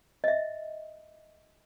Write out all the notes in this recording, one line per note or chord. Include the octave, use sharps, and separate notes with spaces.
D#5 E5